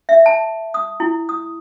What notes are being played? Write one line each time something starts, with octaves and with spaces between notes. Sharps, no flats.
E5
A5
D#6
E4
D#6